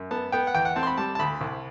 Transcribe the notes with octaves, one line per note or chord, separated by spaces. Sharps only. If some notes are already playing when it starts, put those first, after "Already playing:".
Already playing: F#2
B3 A5
B3 G5
F#5
E2 G5
F#5
C4 A5
C6
B5
G3 A5
A5
D2 B5
C2